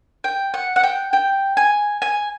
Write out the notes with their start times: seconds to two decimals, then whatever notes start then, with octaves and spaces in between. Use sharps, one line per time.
0.24 G5
0.54 F#5
0.76 F#5
0.83 G5
1.13 G5
1.57 G#5
2.02 G#5